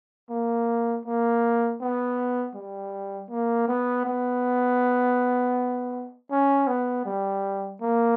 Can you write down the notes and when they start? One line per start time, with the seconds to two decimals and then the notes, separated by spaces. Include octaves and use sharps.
0.30 A#3
1.06 A#3
1.81 B3
2.55 G3
3.30 A#3
3.68 B3
4.06 B3
6.31 C#4
6.68 B3
7.05 G3
7.81 A#3